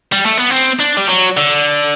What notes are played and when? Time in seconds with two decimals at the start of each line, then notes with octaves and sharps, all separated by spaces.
0.12 G3
0.25 A3
0.37 B3
0.50 C4
0.79 D4
0.97 G3
1.08 F#3
1.37 D3